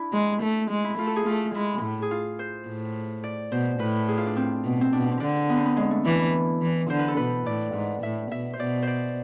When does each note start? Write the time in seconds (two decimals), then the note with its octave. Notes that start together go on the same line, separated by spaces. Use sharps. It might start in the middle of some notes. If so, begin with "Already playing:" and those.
Already playing: D4 E4
0.13 G#3
0.42 A3
0.70 G#3
0.84 E4
0.98 A3 F4
1.07 A4
1.16 G#4
1.26 A3 F4
1.55 G#3 E4
1.82 A2
2.02 G#4
2.11 F4
2.39 C5
2.67 A2
3.24 D5
3.52 B2 C5
3.80 A2 B4
4.08 G#4
4.18 F4
4.27 D4
4.37 C4
4.64 B2
4.81 C4
4.93 B2 D4
5.11 C4
5.20 D3 D4
5.50 B3
5.57 C4
5.66 B3
5.77 G#3
5.91 A3
6.05 E3 D4
6.19 E4
6.61 E3
6.90 D3 C5
6.99 B4
7.08 A4
7.17 B2 B4
7.46 A2 D5
7.75 G#2
8.02 A2 E5
8.31 B2 E5
8.53 C5
8.59 B2 D5
8.83 C5 D5